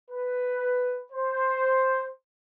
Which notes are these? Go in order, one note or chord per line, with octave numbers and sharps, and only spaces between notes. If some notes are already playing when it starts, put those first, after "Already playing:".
B4
C5